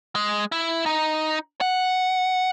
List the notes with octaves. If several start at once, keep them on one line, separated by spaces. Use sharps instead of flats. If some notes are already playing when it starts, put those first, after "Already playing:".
G#3
E4
D#4
F#5